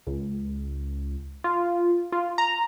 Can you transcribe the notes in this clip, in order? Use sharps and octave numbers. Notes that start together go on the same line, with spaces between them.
C#2
F4
F4
A#5